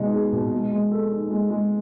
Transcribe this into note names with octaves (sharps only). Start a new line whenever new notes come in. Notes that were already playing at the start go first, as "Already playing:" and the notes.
Already playing: B2 G#3 D#4
G#4
B2
G#3
G#3
A4
D#4
G#3
G#3